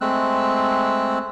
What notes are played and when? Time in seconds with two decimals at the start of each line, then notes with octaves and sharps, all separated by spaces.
0.01 G#3 A3 C4 E6 F#6